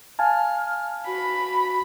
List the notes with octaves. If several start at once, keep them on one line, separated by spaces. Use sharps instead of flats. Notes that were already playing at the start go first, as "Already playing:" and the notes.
F5 G#5 A5 F6
F#4 B5